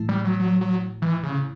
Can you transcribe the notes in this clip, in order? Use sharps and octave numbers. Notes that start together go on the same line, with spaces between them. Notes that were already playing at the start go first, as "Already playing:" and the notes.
Already playing: A2 E3 A3 E4
G3
F#3
F#3
F#3
E3
C#3